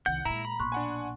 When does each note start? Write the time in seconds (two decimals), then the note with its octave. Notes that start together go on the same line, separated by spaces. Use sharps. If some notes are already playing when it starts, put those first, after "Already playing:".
0.06 C2 D#3 F#5 G6
0.25 A#2 G#3 E4 A#5
0.45 B5
0.60 A#1 B2 C6 C#6 F#6
0.72 D4 F#5 G#5